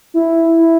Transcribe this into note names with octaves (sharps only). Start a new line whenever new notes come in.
E4